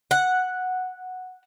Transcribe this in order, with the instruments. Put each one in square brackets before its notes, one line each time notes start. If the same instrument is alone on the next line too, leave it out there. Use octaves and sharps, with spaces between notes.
[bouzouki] F#5